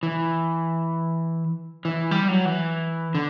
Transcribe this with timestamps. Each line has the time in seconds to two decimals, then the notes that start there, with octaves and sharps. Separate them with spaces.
0.03 E3
1.85 E3
2.11 G3
2.28 F#3
2.45 E3
3.15 D3